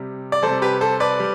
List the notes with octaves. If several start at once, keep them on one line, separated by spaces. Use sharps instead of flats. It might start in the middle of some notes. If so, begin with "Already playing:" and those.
Already playing: C3 G3
D5
C3 G3 A4 C5
G4 B4
A4 C5
B4 D5
G3